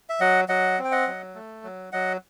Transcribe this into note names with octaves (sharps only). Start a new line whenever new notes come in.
E5
F#3 D#5 F#5
F#3 D#5 F#5
C4
G5
D#5 F#5
F#3
A3
F#3
F#3 D#5 F#5